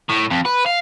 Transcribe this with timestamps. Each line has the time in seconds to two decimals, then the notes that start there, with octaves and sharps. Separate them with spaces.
0.09 A2
0.30 F2
0.45 B4
0.66 F5